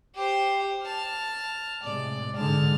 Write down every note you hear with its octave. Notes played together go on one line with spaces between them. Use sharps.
G4 C5
A5 F6
A2 C3 G#3 D5
G#2 D3 G#3 A5 F6